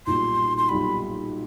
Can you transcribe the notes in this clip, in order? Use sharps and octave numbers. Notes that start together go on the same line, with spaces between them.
B1 A#2 G3 C6
C6
B1 A#2 G3 B5